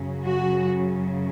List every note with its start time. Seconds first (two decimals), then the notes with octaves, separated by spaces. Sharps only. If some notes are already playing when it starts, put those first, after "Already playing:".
Already playing: F#2 C#3 F#3
0.23 F#4